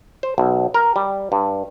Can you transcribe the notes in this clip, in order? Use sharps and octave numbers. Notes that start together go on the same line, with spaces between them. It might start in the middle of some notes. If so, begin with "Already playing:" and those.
C5
B1
A#4
G3
G2